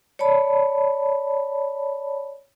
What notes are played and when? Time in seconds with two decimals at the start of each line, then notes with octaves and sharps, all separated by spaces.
0.19 C#5 D5 A5 B5